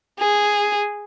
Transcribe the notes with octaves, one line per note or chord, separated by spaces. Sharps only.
G#4